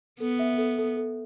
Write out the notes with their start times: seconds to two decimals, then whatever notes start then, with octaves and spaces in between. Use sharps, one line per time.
0.20 B3 A4
0.39 E5
0.58 A4
0.78 A4
0.97 A4